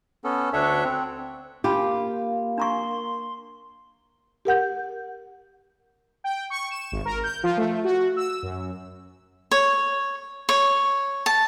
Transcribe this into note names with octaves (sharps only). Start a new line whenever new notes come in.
B3 C#4 A4
D2 D4 A4 C#5 E5 F#5
C4
A#3 D4 F4 G4 B5
D4 A#5 C6 C#6
G4 A#4 F#5 G6
G5
C#6
E7
G#1
A#4
G6
F3
A3
F#4
E6
F#2
C#5
C#5
A5